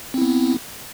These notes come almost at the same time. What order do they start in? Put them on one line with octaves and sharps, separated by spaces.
C4 E4 B3